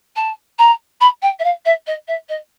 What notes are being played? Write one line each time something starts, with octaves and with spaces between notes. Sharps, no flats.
A5
A#5
B5
G5
E5
F5
E5
D#5
E5
D#5